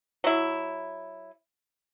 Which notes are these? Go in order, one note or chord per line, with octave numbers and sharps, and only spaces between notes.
F#3 E4